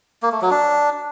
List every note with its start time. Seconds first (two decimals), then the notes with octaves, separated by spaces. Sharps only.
0.23 A#3
0.32 A3
0.41 F#3
0.51 D4